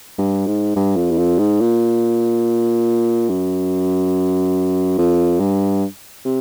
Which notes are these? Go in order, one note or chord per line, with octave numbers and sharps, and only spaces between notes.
G2
G#2
G2
F2
E2
F2
G#2
A#2
F#2
F2
G2
C3